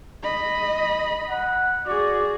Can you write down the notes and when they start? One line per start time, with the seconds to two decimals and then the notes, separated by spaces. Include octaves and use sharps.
0.24 D#5 B5
1.29 F#5
1.86 F#4 G#4 D5